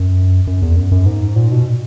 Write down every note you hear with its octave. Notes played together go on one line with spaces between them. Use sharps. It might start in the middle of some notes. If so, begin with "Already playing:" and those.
Already playing: F#2
F#2
E2
F#2
F#2
G#2
A#2
B2